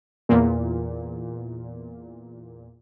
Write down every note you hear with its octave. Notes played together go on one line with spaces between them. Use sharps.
E2 A#2